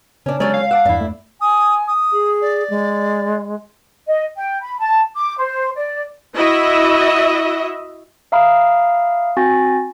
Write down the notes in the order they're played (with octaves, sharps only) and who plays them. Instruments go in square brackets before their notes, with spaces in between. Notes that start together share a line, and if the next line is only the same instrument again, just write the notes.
[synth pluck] C#3 [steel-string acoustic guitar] C#4 D4
[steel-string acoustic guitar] D3 F#3 C#4 [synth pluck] G#3 [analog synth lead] D5
[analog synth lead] F5
[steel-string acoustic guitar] F#5 [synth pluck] A5 D6 E6
[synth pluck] E2 G2 [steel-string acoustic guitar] D4 E4
[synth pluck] A3
[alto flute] G#5 [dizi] D#6
[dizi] D#6
[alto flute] G#4
[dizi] D5
[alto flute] G#3
[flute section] D#5
G5
B5
A5
D6
C5
D5
[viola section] E4 F#4 D#5 E5
[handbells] E5 F5 A#5 B5 D#6 F6
C4 F#4 G#5 A6 A#6